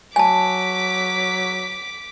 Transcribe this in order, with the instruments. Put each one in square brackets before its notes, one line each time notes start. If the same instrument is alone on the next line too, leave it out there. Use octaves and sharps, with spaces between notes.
[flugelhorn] F#3 [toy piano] G#5 A5 [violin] D6 B6